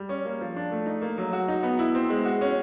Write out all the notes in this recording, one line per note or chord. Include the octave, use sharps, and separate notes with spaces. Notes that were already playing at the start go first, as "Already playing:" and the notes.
Already playing: G3
C#4
A#3
F3
D4
A3
D#4
A#3
F#3
F#4
D#4
B3
E4
C4
G#3
F#4
C#4